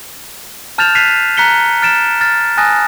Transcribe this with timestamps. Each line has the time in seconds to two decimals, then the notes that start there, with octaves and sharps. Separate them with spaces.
0.78 A5 F6 G6 A6 E7 F7
0.95 F6 F#6 B6 C7 D#7 F7
1.37 A#5 F#6 B6 C#7 G7
1.82 F6 A6 D7 E7
2.21 F6 A6
2.58 G#5 A5 D#6 F#6 A6 A#6